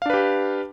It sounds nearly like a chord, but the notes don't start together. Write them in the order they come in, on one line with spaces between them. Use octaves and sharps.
F5 D4 B4 G4